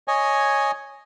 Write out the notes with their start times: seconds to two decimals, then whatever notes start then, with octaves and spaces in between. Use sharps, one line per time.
0.08 C#5 D#5 G#5